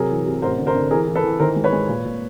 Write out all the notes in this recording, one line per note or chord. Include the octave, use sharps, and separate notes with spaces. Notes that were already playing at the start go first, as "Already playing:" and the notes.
Already playing: C3 F#3 G#4 A#4
E3
C3
A1 A#4 C5
D3
A#4 C5
D3
E3 G#4 A#4
E3
A4 B4
E3
D#3 A#4 C5
G#3
B4 C#5
G#3
A#2
A#2